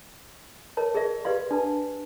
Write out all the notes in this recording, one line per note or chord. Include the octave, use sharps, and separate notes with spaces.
A#4 C#5 A5
G#4 A#4 D5 E5
G4 B4 D5 F5 C6
D4 B4 A5